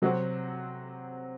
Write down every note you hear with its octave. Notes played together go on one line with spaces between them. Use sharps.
C3 F#3 C4 F#4